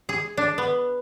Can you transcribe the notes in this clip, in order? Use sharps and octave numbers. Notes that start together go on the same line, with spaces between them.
G#4
D4
B3